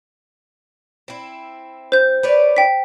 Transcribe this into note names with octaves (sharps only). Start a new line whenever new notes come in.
C4 E4
C5 G6
B4 C#5 D5
G5 B6